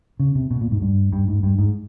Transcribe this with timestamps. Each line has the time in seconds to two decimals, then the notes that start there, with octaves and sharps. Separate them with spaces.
0.20 C#3
0.35 C3
0.51 B2
0.61 A#2
0.71 G#2
0.82 G2
1.13 G2
1.28 G#2
1.43 G2
1.59 G#2